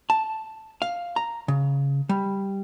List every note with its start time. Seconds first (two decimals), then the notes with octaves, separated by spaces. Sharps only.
0.10 A5
0.82 F5
1.16 A#5
1.48 C#3
2.09 G3